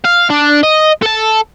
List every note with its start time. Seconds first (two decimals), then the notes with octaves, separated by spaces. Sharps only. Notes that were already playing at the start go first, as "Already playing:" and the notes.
0.04 F5
0.30 D4
0.63 D#5
1.02 A4 A5